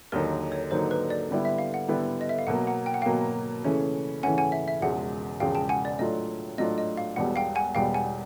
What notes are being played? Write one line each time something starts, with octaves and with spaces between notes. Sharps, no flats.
D#2 D3 F#3 A#3 D#4 A#4
C#5
D#2 D3 F#3 A#3 D#4 C5
B4
D5
D3 G3 B3 E4
E5
F5
F#5
D3 G3 B3 E4
D#5
E5
F5
B2 F#3 A#3 F#5
F#5
G5
F#5
B2 F#3 A#3 F5 G5
C#3 E3 A3 C#4
C#3 E3 A3 C#4 F#5 G#5
F#5 G#5
E5
E5
E1 E2 C#3 F3 G#3 F#5
E1 E2 C#3 F3 G#3 F5 G5
G5 A5
F#5 G#5
D5
A2 F#3 A3 D4 F4 D#5
A2 F#3 A3 D4 F4 D#5
D#5
F5
E1 E2 B2 G3 F#5
F5 G5
F#5 G#5
E1 E2 B2 G3 F5 G5
F#5 G#5